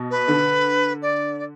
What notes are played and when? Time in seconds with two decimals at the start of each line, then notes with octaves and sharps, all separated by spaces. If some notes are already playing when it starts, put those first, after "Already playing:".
Already playing: B2
0.10 B4
0.28 D3
1.02 D5
1.38 D5